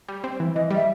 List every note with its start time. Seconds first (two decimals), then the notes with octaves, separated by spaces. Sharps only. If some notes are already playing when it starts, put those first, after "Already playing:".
0.08 G3
0.24 C4
0.40 E3
0.55 E3 D#5
0.70 G3
0.76 E5